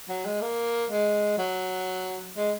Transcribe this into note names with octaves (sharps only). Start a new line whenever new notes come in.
F#3
G#3
A#3
G#3
F#3
G#3